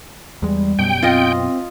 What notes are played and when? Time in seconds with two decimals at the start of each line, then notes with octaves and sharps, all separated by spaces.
0.42 E2 G3 G#3
0.79 F#2 B2 G5
1.03 C4 F4 D#5